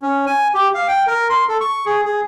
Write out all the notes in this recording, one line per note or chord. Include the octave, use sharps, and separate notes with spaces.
C#4
G#5
G4
F5
G5
A#4
C6
A4
C#6
G#4
G#4